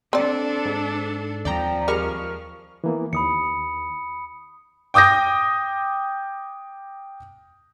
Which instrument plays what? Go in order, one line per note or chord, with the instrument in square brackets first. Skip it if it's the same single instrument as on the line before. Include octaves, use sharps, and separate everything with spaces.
[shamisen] C4 D5 [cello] D4 A4
[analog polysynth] G#2
[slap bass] D#2 D#3 C4 [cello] F3 [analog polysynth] D5 G5 A#5
[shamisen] G3 G#3 [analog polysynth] A#4 C#6 F6
[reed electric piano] E3 A#3 B3
[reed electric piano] D#2 [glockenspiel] B5 D#6 C#7
[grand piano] G5 D6 D#6 G6 A#6